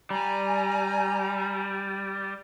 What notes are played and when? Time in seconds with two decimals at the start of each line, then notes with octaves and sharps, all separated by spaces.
0.10 G3 G#5 A#5